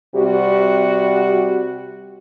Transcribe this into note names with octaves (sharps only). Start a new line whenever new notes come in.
C3 G3 F#4